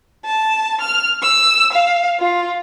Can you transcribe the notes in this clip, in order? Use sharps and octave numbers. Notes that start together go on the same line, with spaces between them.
A5
F6
E6
F5
F4